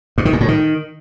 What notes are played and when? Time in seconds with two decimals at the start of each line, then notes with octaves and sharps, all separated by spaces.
0.18 G2
0.25 D#3
0.33 A#2
0.41 A2
0.48 D#3